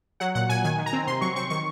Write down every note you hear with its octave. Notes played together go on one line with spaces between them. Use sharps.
F#3 F#5
A#2 F#5
A#2 G#5
D#3 G#5
D#3
A#5
C4
C3 C6
F#3 C#6
C4 C#6
D#3 C#6